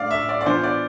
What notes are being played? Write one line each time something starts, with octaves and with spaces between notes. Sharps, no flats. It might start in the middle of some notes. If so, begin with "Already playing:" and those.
Already playing: A2 D5 F5
E5
D5
D5
E3 B3 D4 F4 C5
D5